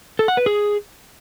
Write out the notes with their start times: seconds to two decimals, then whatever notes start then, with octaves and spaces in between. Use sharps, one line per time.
0.19 A4
0.28 F#5
0.37 B4
0.46 G#4